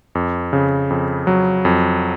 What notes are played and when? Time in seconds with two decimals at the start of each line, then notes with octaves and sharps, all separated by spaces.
0.15 F2
0.53 C#3
0.90 F2
1.27 F#3
1.65 F2